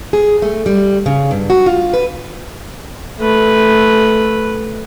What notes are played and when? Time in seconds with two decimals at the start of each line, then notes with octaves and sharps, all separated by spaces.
0.13 G#4
0.42 A3
0.66 G3
1.06 C#3
1.31 G2
1.50 F#4
1.66 F4
1.93 B4
3.20 A3 B4